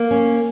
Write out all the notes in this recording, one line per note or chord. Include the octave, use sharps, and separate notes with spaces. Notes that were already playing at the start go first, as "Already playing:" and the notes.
Already playing: A#3
C#4